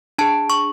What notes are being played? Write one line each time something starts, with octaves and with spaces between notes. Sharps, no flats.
D4 G#4 A5
C#6